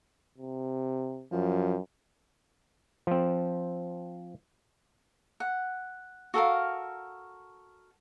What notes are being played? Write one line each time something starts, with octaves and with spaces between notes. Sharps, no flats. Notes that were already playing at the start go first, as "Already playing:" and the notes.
C3
F#2 F3
F3 C4
F#5
F#4 A4 A#4 F5